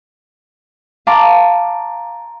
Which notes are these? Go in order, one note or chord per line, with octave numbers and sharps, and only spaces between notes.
F5 A5 A#5 C6 D6